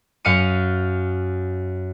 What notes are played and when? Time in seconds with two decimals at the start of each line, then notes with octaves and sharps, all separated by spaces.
0.25 F#2 F5 C#7 D#7